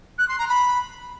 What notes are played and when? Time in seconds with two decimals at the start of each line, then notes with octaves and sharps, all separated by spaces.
0.18 F#6
0.28 C6
0.38 A#5
0.48 B5